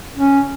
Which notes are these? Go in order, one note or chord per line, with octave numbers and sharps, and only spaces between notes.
C#4